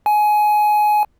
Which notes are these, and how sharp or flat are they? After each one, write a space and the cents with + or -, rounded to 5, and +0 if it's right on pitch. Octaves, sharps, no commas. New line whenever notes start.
G#5 +20